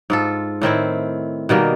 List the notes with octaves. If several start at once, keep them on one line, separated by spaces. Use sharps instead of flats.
G#2 F4 A4
A2 D#3 C4 E4
B2 D#3 G3 A#3